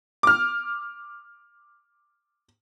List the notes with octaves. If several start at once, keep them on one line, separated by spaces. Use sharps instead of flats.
D6 F6